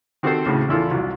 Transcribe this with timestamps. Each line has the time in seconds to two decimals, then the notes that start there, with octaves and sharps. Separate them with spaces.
0.23 D#3 C4 F#4 G4 A4 C5
0.46 C#2 A2 C#3
0.69 E2 E4 F4 A4
0.91 C2 F#3